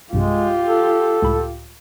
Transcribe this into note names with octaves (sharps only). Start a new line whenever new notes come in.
B1 G2 C3 G#3 F4 G4
A4
C#2 A2 B5